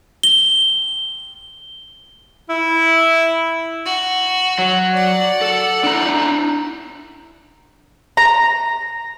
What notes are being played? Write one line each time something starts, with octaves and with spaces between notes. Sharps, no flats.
G7
E4
F#4
F#3
D5 F#5
A4
D4 E4 A#5
A#5